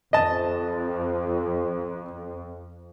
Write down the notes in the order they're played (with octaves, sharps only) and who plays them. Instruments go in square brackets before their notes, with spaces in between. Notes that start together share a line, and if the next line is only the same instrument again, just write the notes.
[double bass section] F2 [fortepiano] D#5 A5